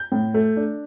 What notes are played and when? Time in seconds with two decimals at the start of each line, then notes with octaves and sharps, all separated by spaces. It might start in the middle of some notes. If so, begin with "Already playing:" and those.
Already playing: G6
0.12 A2
0.34 A3
0.57 D4